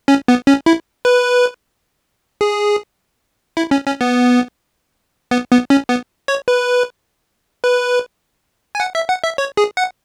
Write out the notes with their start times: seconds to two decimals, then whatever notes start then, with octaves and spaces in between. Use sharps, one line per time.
0.08 C#4
0.28 B3
0.47 C#4
0.66 E4
1.05 B4
2.41 G#4
3.57 E4
3.71 C#4
3.86 C#4
4.01 B3
5.31 B3
5.51 B3
5.70 C#4
5.89 B3
6.28 C#5
6.48 B4
7.64 B4
8.75 G#5
8.80 F#5
8.95 E5
9.09 F#5
9.24 E5
9.38 C#5
9.57 G#4
9.77 F#5